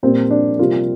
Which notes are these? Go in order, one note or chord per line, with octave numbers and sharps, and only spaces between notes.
A#2 G3 A#3 C4
D4
C3 G3 A#3 F4